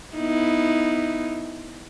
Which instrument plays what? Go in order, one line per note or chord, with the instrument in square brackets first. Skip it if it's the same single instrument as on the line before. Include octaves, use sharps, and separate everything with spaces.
[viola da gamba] B3 D#4 E4